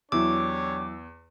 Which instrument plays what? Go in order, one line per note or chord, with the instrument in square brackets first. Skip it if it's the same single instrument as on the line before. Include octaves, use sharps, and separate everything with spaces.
[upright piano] E2 [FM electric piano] F#3 E4 E6 [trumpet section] D4 G4 C#5 [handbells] D6